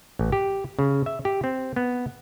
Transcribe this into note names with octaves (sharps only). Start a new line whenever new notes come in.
A1
G4
C#3
E5
G4
C4
B3